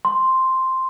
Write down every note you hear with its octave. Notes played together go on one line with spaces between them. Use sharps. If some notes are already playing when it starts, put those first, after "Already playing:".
C6